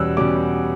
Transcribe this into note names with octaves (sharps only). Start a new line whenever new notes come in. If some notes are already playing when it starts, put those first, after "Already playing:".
Already playing: E2 B2 G3 C#4 E6 F#6
B2 G3 C#4 D6